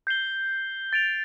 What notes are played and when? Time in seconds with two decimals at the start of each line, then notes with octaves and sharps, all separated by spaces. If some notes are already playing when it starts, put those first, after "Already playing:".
0.07 G6 C7 G7
0.93 A6 D7 F7